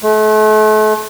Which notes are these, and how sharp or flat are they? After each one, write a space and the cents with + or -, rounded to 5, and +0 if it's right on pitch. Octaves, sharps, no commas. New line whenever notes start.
A3 -40